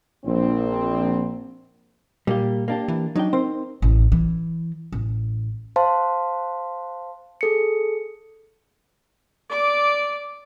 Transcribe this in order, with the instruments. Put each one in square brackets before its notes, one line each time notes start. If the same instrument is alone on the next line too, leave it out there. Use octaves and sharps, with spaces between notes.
[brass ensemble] A#1 C4
[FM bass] A#2 [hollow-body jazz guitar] G3 A#3 G4
[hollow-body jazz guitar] A#3 D4 G4
[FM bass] E3
[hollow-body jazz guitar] F#3 D4 G5 [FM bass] D#4
[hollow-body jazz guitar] C4 A#4 C5
[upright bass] A1
E3
A1
[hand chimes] C5 F5 A5 C6
G#4 A4 C#7
[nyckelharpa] D5 D6